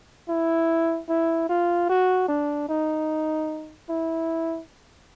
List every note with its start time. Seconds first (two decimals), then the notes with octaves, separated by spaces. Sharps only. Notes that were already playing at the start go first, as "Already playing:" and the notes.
0.29 E4
1.09 E4
1.49 F4
1.89 F#4
2.28 D4
2.69 D#4
3.89 E4